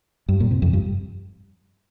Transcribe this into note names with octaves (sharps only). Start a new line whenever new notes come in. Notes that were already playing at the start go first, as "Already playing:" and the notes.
G2
A#2
C3
F2
G2